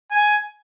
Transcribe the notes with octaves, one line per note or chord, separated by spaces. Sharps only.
G#5